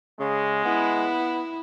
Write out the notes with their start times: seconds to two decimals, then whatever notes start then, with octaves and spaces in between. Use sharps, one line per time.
0.20 C#3 G#3
0.65 B3 E4